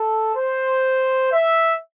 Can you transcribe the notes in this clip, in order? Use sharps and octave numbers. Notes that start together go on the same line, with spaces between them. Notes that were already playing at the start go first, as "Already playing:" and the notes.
Already playing: A4
C5
E5